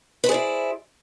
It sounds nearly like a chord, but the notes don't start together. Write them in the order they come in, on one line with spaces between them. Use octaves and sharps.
B4 C5 G#4 D5 E4